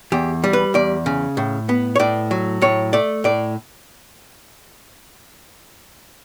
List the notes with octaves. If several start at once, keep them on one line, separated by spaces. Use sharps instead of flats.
E2 G4
G3
B4
E2 D5
C#3
A2
B3
C#5
A2 D5
F#3
A2 C#5
A3 D5
A2 D5